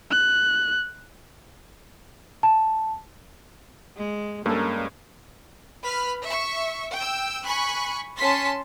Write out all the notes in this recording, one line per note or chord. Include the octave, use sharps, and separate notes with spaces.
F#6
A5
G#3
G2 G#3 A#3 C#4 A4 A#4
B4 B5 F6
E5 C#6
G5 E6
G#5 B5 C#6 F#6
C#4 A5 C6 B6